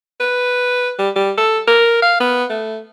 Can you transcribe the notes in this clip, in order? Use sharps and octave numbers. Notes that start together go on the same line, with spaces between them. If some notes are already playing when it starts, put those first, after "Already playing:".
B4
G3
G3
A4
A#4
F5
B3
A3